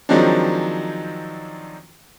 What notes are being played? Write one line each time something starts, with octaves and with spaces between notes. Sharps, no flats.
D#3 F3 F#3 G#3 C4 D4